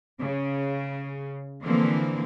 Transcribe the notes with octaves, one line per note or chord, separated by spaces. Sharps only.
C#3
D3 E3 F3 A#3 C4